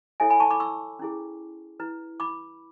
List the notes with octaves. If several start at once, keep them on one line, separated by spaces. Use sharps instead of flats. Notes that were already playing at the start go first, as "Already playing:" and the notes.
E4 A4 C#5 E5 G#5
G#5 B5
A5 C#6
B5 D6
C#6 E6
C#4 E4 G#4
E4 B4
B5 D6